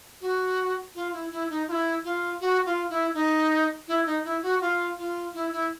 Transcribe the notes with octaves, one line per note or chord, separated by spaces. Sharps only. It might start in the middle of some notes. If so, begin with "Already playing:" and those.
F#4
F4
E4
E4
D#4
F4
E4
F4
F#4
F4
E4
D#4
E4
D#4
E4
F#4
F4
F4
E4
E4